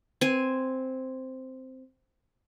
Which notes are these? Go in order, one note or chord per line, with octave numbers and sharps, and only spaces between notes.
C4 G#5